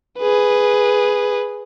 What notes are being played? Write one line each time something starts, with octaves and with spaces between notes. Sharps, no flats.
G#4 B4